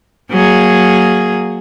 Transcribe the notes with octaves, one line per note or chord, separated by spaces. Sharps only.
F#3 A#3 G#4